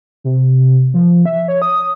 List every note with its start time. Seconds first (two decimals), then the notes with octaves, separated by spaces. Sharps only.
0.24 C3
0.94 F3
1.26 E5
1.48 C#5
1.62 D#6